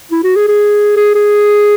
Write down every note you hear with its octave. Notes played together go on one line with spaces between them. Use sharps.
E4
F#4
G#4
G#4
G#4
G#4